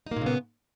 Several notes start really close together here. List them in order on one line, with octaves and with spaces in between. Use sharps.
D#4 A#3 A#2 C#3 B3